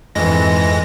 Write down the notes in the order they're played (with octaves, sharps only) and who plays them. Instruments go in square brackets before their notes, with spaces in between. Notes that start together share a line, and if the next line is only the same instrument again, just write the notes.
[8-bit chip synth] F2 G#3 A#6 [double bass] G#2 E3